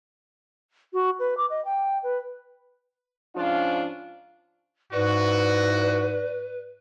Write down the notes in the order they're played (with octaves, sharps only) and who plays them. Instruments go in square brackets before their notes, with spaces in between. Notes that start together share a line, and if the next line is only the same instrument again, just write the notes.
[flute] F#4
B4
D6
D#5
G5
B4
[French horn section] G#2 F3 C#4 D4 F4
[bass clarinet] G#2 [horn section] E4 F#4 [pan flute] B4 [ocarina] D5